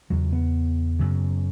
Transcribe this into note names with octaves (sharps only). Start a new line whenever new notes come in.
E2 C#3 F#3
B3
F#2 C#3